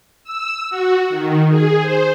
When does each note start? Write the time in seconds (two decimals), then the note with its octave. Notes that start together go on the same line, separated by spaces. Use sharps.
0.24 E6
0.70 F#4
1.10 D#3
1.48 G#4
1.81 C5